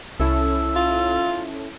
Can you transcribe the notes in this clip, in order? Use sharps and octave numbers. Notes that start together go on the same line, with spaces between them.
C2 C#4 E4 A4 E6
F4